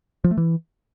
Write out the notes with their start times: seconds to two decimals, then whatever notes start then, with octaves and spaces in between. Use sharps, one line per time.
0.24 F3
0.31 A3
0.37 E3